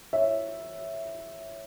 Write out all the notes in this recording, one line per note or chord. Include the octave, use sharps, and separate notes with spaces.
C#5 E5